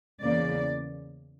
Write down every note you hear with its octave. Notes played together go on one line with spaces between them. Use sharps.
E2 C#3 E3 A#3 D5